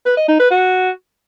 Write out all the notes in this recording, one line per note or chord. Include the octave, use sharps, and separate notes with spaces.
B4
D#5
D#4
B4
F#4